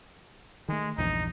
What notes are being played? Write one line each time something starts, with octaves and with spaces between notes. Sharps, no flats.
D#3 G#3 A3
A#1 E2 G2 D#4